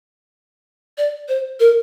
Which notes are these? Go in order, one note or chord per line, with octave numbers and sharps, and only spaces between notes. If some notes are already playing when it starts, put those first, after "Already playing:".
D5
C5
A#4